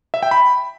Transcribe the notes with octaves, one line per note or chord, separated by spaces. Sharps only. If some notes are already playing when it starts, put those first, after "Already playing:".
E5
G5
B5